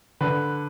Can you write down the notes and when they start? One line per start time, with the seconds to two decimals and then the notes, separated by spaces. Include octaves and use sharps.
0.21 D3 B4